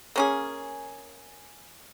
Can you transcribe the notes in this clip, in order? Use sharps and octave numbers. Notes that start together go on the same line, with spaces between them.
A#3 C#4 G#4